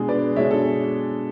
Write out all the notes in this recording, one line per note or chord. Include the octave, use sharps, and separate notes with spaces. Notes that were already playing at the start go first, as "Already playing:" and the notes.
Already playing: B2 G#3 D4 G#4
B4 D5
B2 G#3 D4 C#5 E5
A4 C#5